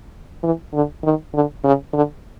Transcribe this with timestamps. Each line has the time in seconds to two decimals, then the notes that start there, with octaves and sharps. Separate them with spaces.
0.43 E3
0.74 D3
1.04 D#3
1.34 D3
1.64 C#3
1.93 D3